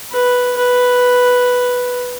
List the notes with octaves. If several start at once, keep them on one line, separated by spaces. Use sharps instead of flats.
B4
B4